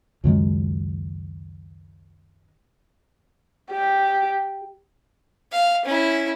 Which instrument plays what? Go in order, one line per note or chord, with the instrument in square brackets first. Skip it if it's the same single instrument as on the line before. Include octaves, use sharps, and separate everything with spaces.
[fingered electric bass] C#2 F#2 D#3 G#3
[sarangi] G4
[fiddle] F5
C#4 E4